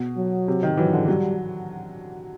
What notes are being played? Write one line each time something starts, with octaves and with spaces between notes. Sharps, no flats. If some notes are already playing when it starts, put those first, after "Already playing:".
Already playing: B2
F#3
C3
D#3
E3 F#3
D3
F#3 G3